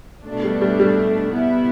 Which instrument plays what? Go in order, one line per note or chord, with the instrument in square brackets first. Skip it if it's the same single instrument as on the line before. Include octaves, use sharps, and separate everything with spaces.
[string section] B2 A3 D4
[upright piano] G3
G3
G3
[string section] B2 B3 E4